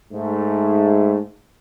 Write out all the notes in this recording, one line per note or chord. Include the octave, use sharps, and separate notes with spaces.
G#2 A3